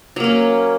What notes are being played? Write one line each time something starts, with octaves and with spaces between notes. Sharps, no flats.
F#3 A#3 C#4